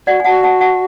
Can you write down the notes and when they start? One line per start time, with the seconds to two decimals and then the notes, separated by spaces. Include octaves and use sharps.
0.07 F#4 D5 F#5
0.20 G#5
0.25 F#4 F#5 A5
0.43 F#5 A5
0.61 F#5 A5